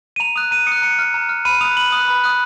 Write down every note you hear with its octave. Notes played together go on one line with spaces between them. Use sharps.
D#7
A#5 F7
D#6 F#6 F7
A#5 D#7
D#6 C#7
F#6
A#5 C#7
F6
A#5
F6
B5 D#7
D#6 F#6 F7
B5 F#7
D#6 F#6
B5
D#6 F#6